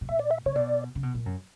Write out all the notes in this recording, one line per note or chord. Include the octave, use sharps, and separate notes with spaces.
B2
A#2 E5
D5
E5
C#3 C#5
B2 D5
C#3
B2
A#2
F#2